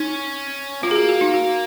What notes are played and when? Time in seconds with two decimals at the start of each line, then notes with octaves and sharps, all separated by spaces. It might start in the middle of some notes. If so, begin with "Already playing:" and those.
Already playing: C#4 D#4
0.83 A#3 F4
0.91 G#4
0.95 F#4
1.09 F#4
1.21 D#4
1.34 F#4